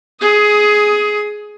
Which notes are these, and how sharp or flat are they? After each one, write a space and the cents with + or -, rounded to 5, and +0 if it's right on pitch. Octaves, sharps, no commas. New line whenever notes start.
G#4 +10 D#6 +25